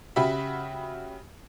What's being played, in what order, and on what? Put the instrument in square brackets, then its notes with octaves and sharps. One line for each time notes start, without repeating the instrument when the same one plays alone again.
[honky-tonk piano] C#3 F#4 G4 E5 B5